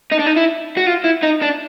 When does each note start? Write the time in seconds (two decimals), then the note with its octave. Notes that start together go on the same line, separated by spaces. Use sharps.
0.11 D#4
0.19 D4
0.26 D#4
0.36 E4
0.77 F#4
0.87 F4
1.05 E4
1.23 D#4
1.42 D4